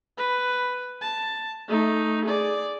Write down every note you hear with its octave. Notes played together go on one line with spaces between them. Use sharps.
B4
A5
A3 D#4
G#4 D5